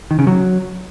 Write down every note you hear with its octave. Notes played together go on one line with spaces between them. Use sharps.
D#3
C#3
F#3